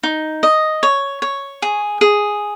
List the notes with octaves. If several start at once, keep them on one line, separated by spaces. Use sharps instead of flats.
D#4
D#5
C#5
C#5
G#4
G#4